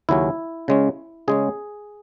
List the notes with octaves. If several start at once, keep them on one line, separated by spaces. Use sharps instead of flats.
D#2 C#3 F#3 C#4 E4
C#3 G#3 C#4
C#3 G#3 C#4 G#4